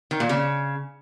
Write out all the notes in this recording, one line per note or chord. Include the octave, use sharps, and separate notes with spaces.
D#3
A#2
C#3